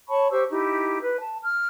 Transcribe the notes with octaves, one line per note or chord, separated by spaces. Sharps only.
C#5 A5 B5 C#6
G4 C5 C#6 E6
D#4 E4 G4
B4
A5
F6